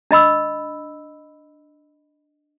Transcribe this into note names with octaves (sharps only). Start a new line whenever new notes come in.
D4 D#5 B5 E6